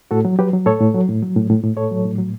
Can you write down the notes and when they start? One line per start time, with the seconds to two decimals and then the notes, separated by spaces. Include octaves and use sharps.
0.11 A2 F#4 A4
0.25 F#3
0.39 F#3 G4 B4
0.53 F#3
0.66 A2 A4 C#5
0.81 A2
0.95 F#3
1.09 A2
1.22 F#3
1.36 A2
1.50 A2
1.63 A2
1.77 A2 A4 C#5
1.91 F#3
2.05 A2
2.19 F#3